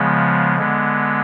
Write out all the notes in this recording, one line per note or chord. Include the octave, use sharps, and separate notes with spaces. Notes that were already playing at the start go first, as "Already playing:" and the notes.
Already playing: C#3 F3 G#3 B3
D3 G#3 B3